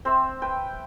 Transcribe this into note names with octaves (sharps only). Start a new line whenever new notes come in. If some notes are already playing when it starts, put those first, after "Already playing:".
C4 C5 E5
B4 G5